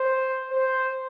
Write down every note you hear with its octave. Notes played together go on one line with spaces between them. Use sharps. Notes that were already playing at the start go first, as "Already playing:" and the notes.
Already playing: C5
C5